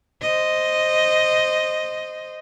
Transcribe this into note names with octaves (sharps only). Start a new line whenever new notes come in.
C5 D#5